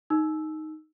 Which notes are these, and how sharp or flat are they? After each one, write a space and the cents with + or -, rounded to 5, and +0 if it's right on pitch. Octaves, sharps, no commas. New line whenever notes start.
D#4 +0 E6 +0